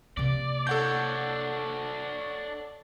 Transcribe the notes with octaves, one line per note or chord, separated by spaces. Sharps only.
C3 A#3 D5
D4 A4 C#5 F#5 G6